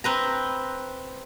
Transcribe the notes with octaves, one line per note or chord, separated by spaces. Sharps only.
C4 B4 A#5